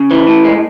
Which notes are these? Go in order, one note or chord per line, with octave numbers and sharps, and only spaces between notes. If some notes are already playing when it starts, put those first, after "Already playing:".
Already playing: C#3
E3
A2
G#3